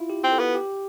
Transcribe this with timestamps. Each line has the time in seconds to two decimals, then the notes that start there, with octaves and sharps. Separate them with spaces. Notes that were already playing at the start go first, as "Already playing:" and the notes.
Already playing: E4 F4
0.10 G4
0.24 C4
0.32 A4
0.39 B3
0.55 G4